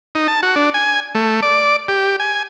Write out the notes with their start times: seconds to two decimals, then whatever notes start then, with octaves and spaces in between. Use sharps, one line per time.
0.15 D#4
0.28 A5
0.43 F#4
0.56 D4
0.74 G#5
1.15 A3
1.42 D5
1.88 G4
2.20 G#5